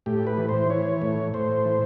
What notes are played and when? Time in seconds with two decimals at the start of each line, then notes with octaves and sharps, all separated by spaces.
0.06 A2 G4
0.27 B4
0.37 E3
0.49 C5
0.70 E3 C#5
1.02 A2
1.34 A2 C5
1.65 E3